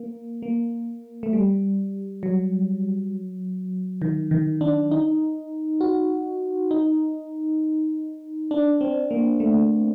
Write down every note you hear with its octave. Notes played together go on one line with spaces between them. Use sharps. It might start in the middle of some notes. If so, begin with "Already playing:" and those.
Already playing: A#3
A#3
A3
G3
F#3
D#3
D#3
D4
D#4
F#4
D#4
D4
C4
A#3
A3